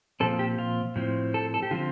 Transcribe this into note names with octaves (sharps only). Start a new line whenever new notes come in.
A#2 F3 C4 A4
G4
F4
A2 F3 C4
A4
A4
G4
D3 F3 C4 F4